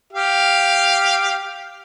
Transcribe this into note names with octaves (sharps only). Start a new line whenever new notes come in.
G4 F5